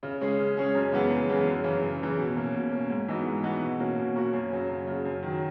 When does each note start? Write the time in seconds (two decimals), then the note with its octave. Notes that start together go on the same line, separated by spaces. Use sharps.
0.03 C#3
0.21 G#3 C#4 G#4
0.38 C#3
0.57 G#3 C#4 G#4
0.75 F#2
0.92 C#3 E3 G#3 B3
1.10 F#2
1.29 C#3 E3 G#3 B3
1.46 F#2
1.64 C#3 E3
1.82 F#2
2.00 C#3 E3
2.19 B2
2.36 A#3 C#4
2.54 B2
2.71 A#3 C#4
2.90 G#2
3.08 E3 B3 D#4 F#4
3.26 G#2
3.43 E3 B3 D#4 F#4
3.62 B2
3.79 A#3 C#4 F#4
3.98 B2
4.15 A#3 C#4 F#4
4.33 F#2
4.52 C#3 F#3
4.69 F#2
4.87 C#3 F#3
5.05 F#2
5.23 D#3 F#3